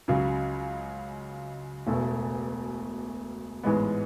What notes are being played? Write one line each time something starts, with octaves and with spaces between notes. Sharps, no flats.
C#2 C#3 F#3
E1 E2 B2 A3
A1 G#2 E3 G#3 B3